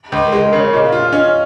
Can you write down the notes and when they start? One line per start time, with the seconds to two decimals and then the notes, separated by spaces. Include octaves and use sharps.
0.12 C#2
0.27 A#4
0.32 G#3 G#4
0.45 A#4
0.53 C#3
0.59 C#5
0.73 A#2 D#5
0.85 F5
0.92 F4
0.99 F5
1.12 C#4 D#5